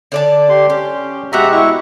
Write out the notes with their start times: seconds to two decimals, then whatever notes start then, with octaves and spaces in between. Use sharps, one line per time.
0.12 D3 D5 A5
0.49 G4 C6
0.70 C#4 G4
1.33 B2 G#3 F#4 G4 E5 F#5 A#5
1.52 E4 C#6